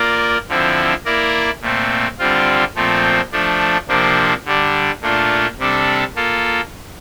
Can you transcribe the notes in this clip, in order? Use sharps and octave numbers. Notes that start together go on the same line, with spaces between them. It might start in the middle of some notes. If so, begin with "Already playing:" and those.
Already playing: A#3 F4 A#4 D5
D3 F3 C4 E4
A#3 E4 A#4 D5
A#2 A3 C4
D3 G3 C4 F4
A#2 F3 A3 C4
F3 A3 D4
C3 F3 A#3 D4
D3 G3 D4
A#2 A3 D4 F4
C3 G3 D4 A4
A#3 F4 A4